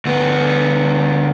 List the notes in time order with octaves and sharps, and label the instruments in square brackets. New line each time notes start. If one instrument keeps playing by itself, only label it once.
[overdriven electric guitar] D2 B3